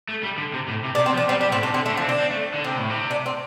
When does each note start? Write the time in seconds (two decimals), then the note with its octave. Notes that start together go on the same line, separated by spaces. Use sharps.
0.09 A3
0.23 G3
0.38 D3
0.53 C3
0.68 A2
0.84 C3
0.95 D4
0.99 C3
1.06 C4
1.14 F3
1.17 D4
1.29 G3 C4
1.41 G3 D4
1.52 A2 C4
1.63 C3 D4
1.74 D3 C4
1.86 A3
1.90 D3
1.97 F3
2.04 C4
2.09 D4
2.20 C4
2.31 A3
2.54 D3
2.64 C3 C4
2.78 A2
2.90 C3
3.11 D4
3.26 C4